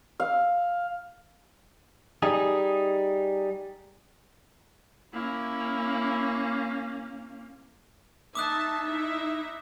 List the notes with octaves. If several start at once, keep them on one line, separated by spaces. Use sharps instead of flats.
F5
G3 D#4 G#4
A#3 C#4 E4
D#4 E5 A5 D6 D#6 F#6
D#4 E4 E5